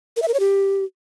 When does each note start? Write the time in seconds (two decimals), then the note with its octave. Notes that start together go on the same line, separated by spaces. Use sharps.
0.16 A#4
0.22 E5
0.28 A#4
0.34 C#5
0.40 G4